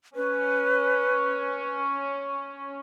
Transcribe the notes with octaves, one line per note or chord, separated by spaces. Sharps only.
C#4 B4